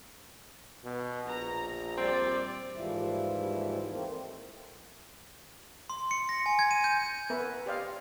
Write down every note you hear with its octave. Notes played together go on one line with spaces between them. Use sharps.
B2
A#1 A#5
G3 C4 D5
D#2 G#2 E3 F3 G3 E4
A3 A#3 C4
C6
C#7
A#6
G#5
G#6
D#7
G6
B3 A#4 B4 E5
G4 C5 D5 D#5 F5